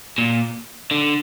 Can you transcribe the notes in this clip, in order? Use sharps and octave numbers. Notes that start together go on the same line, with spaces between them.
A#2
D3